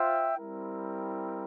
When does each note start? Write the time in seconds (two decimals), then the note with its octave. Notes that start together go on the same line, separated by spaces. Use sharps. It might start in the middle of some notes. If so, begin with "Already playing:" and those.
Already playing: F4 C5 E5 G5
0.36 G3 C4 E4 A#4